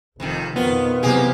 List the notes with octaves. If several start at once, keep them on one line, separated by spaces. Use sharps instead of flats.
F1 F2 C3 D#3
F2 B2 D#3 B3 F4
C3 E3 F#3 A#3 G4 G#4